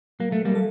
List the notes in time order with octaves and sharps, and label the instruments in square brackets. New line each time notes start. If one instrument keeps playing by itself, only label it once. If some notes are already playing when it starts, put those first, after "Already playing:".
[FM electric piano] F#3 [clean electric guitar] A#3
[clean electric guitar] A3
G3 A#3
[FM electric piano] A4